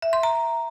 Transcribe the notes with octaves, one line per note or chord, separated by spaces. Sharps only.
E5
C6
A#5